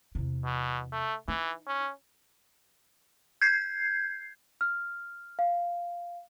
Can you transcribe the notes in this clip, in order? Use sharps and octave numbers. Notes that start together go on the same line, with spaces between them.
E2 C3
B2
A3
E3 D#4
C#4
G6 G#6 C7
F6
F5